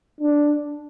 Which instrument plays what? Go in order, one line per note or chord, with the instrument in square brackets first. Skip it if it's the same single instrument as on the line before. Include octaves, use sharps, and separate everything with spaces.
[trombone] D4